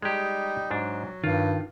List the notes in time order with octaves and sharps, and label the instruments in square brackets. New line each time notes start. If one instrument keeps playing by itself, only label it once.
[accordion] G3 D#4 [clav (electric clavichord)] G#3 G4
[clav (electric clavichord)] G#2 D4 [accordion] F#3
[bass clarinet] G2 [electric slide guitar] D#3 [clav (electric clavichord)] F4